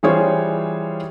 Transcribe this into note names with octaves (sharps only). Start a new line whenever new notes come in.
E3 G3 F4 G#4 C5 C#5